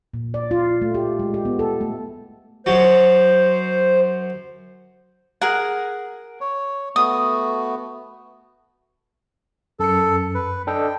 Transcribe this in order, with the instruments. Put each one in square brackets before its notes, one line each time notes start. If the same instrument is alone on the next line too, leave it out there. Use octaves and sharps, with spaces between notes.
[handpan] A#2
D5
F4
A3
G4
G#3
G4
B3
A4
A3
[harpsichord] F#2 F#3 [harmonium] C5
[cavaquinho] G#4 A#4 F#5
[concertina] C#5
[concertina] A3 B3 F#4 [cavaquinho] D#6
[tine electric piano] F#2 C#7 [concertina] A4
[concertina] B4
[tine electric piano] D4 A4 D#5 [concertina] G5